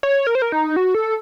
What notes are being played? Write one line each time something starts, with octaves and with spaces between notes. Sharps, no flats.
C#5
A#4
C5
A#4
D#4
F#4
A4